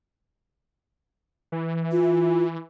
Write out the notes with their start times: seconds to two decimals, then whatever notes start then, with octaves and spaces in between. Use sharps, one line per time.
1.52 E3
1.92 F4